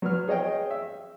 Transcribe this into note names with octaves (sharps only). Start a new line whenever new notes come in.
F#3 B4 F6
G#4 C#5 D#5 G5
E5